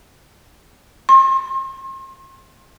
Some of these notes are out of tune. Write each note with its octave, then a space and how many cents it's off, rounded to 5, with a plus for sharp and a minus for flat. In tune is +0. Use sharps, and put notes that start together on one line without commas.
C6 +40